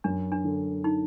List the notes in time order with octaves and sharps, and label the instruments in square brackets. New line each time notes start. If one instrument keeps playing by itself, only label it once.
[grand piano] F#2 [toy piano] D4
[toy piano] D4
[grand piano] D3
[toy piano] D#4